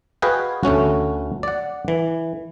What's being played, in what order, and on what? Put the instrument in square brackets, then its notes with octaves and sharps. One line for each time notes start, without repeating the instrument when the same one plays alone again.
[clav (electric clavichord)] F#4 G#4 B4 D#5 F5 G5
D2 A3 C#4 F#4
D5 F#5
E3